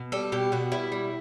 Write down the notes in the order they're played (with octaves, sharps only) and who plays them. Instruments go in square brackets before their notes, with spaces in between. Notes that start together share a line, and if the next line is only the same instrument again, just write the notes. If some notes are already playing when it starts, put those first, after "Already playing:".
Already playing: [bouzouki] B2
G3 A4
B2 G4
B2 F#4
G3 E4
G3